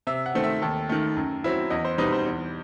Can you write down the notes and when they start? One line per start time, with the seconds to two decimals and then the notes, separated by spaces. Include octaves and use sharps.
0.07 C3 E5
0.26 F#5
0.35 D#3 A3 C4
0.44 E5
0.62 D#2 A4
0.89 D#3 A3
1.16 F#2
1.44 F#3 C4 E4
1.70 E2 D#5
1.85 C5
1.98 B2 G3 C4 D#4 B4
2.12 C5
2.26 E2